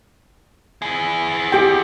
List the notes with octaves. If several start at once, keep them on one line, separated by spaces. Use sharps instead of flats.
E4 G#4
G4 G5